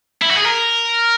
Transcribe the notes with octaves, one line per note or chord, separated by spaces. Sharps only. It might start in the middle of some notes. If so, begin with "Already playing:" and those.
E4
F#4
G#4
A#4